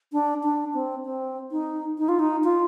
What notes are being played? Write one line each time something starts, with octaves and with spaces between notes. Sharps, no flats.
D4
D4
C4
C4
D#4
D#4
F4
D#4
F4